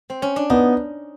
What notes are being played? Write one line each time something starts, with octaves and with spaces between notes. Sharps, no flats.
C4
C#4
D4
B3 D#4